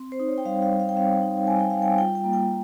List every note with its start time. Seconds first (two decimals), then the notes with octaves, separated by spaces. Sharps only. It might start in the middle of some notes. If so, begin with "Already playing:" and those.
Already playing: C4
0.12 C5
0.19 D#4
0.28 C#5
0.38 G5
0.45 G3 F5
0.62 F5
0.71 G3
0.80 F5
0.89 G5
0.96 C4 F5
1.22 D#4
1.47 G3 G#5
1.59 G5
1.70 G3 F5
1.82 G5
1.98 F4 G5
2.15 G5
2.24 A#3
2.33 G5